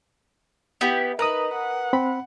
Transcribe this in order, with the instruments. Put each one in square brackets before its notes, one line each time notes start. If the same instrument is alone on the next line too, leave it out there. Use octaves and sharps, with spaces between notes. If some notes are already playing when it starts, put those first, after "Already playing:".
[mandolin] B3 E4 G4
[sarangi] D#4 [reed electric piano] A#4 A#5 D#6 [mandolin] B4
[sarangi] F#5
[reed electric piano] C4 B5